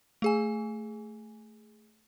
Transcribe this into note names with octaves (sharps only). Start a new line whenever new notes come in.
A3 G#4 G#5